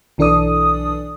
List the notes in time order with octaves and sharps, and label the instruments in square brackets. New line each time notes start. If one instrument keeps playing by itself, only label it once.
[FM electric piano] B1 E3 D4 A4 D5 D#6